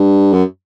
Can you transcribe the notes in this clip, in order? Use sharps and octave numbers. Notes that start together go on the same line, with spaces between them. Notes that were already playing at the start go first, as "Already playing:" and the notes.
Already playing: G2
F#2